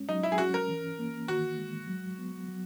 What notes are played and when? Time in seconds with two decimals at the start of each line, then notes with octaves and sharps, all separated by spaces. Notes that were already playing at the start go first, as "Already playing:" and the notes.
Already playing: G#3 C#4
0.09 F#3 D#4
0.23 E4
0.32 G#4
0.38 C#4 F#4
0.54 A#4
0.69 E3
0.99 A#3
1.28 D#3 F#4
1.58 G#3
1.88 F#3
2.18 B3
2.48 F#3